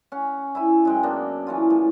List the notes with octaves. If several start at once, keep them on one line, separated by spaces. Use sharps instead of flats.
C#4 F#5
E4 E5 G#5
F#2 G#3 G5
A#3 B3 D4 D#4
E3 C#4 F4
A2